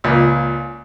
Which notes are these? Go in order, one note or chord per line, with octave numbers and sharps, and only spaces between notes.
C#2 A#2